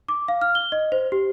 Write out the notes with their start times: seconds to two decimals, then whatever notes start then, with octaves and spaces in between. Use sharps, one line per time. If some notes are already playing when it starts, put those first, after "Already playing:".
0.08 D6
0.28 F5
0.41 F6
0.55 G7
0.72 D#5
0.92 C5
1.12 G4